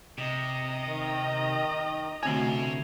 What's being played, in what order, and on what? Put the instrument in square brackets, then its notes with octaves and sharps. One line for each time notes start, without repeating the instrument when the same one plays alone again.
[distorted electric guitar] C3 [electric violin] D#5 A#5
[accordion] D#3
[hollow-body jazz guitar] D2 C3 G#5 [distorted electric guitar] C#5 B5